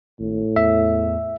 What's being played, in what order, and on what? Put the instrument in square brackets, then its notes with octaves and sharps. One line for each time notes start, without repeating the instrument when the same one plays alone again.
[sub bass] G#1 [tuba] A2
[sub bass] E2 [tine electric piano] E5